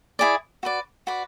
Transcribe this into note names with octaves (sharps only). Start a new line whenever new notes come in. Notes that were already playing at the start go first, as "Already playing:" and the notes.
E4 G#4 D5
F#4 B4 D5
F#4 B4 D5